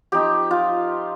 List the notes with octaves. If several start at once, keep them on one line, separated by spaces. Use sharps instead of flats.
F3 C4 D#4 G4
F4